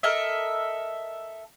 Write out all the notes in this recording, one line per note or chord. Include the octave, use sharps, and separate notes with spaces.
A4 A#4 D#5 E5